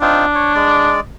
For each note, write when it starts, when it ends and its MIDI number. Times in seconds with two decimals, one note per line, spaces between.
0.01 0.26 60
0.01 0.94 62
0.01 0.26 63
0.01 0.26 65
0.35 0.53 73
0.55 1.00 56
0.55 1.00 74